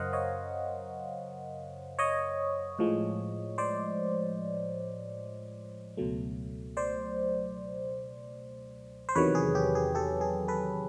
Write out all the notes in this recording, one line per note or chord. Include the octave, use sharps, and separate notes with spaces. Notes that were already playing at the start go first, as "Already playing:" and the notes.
Already playing: F#2 C#3 F#3 A#4 C5 D#5 F5 F#5
C#5 D#5
C#5 D#5
A2 F3 G#3
C5 D5
C#2 B2 F#3 A3
C5 D5
C5
E2 C3 D#3 F#3 B4 C#5
G#4
G4
G#4
G4 A4
G#4
A4 B4